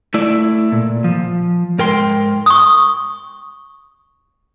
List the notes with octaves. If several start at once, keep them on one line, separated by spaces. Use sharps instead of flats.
A3 E4 D5
A#2
F3
G#2 A#4 G5 C6
C#6 D#6